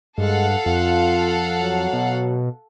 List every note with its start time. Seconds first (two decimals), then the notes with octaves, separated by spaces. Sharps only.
0.18 G2 G#3 A4 F5 F#5
0.66 F2 F4
1.60 F#3
1.93 B2